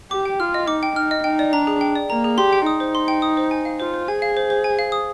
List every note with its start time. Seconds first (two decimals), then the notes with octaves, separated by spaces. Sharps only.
0.11 G4 D6
0.25 G5
0.40 F4 F6
0.54 D#5
0.68 D#4 D6
0.83 G5
0.96 D#4 F6
1.11 D#5
1.24 D#4 G5
1.39 D5
1.53 D4 A#5
1.67 G#4
1.81 G5
1.96 D5
2.10 A#3 A#5
2.24 G#4
2.38 G4 C6
2.53 G5
2.66 D#4 D#6
2.80 C5
2.95 C6
3.08 G5
3.22 D#6
3.37 C5
3.51 G#5
3.65 F5
3.80 F4 C5
3.94 C5
4.08 G#4 G#5
4.22 F5
4.37 C5
4.50 C5
4.64 G#5
4.79 F5
4.92 D#6